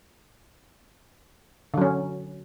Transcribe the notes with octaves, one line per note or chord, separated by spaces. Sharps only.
D3 F#3 C#4